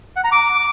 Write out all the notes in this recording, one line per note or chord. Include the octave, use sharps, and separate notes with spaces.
F#5
A#5
D6